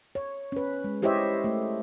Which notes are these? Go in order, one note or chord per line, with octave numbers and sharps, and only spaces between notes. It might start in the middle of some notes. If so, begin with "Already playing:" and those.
C#5
C#4 B4
G#3
E4 G4 C5 C#5 D#5 E5
A3